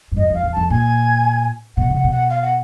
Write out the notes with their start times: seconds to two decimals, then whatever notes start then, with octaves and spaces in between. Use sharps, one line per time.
0.12 G2
0.16 F#2 D#5
0.30 F2 F5
0.43 E2
0.53 F2 A5
0.70 A#2 G#5
1.77 B2 F#5
1.90 C3 F#5
2.04 B2
2.11 F#5
2.30 F5
2.42 F#5